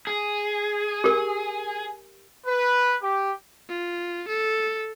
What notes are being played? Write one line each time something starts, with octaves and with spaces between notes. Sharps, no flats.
G#4
G4 A#4
B4
G4
F4
A4